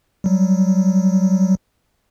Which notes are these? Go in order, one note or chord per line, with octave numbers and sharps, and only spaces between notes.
F#3 G3